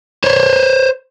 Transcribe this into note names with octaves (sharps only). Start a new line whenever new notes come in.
C5 C#5